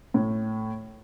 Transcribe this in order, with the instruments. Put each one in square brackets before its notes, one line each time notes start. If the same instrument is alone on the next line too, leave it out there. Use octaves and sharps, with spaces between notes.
[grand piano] A2